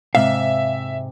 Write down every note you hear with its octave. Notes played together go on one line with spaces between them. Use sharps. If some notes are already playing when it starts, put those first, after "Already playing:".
G#2 C3 E5 F5